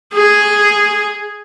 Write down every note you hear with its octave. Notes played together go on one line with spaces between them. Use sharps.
G#4